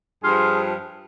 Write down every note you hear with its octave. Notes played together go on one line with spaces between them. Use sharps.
G2 F3 F4 G#4